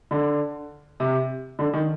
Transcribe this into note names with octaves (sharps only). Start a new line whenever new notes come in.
D3
C3
D3
D#3